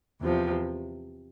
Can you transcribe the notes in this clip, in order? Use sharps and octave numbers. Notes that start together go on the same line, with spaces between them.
E2 C3 F3